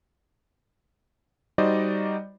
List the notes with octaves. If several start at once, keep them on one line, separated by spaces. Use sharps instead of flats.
G3 D#4 F#4 C5 D5 D#5